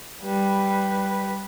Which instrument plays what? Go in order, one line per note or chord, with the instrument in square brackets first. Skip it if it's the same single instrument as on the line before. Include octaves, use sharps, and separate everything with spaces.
[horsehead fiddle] G3 B4